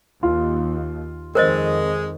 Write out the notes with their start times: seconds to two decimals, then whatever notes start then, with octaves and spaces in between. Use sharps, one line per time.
0.23 D#2 F4
1.35 F2 D#3 G#3 A#4 C5 D#5